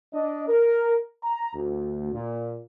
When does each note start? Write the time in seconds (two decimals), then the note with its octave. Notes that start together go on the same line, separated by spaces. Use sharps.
0.14 D4 D#5
0.48 A#4
1.23 A#5
1.55 D2
2.12 A#2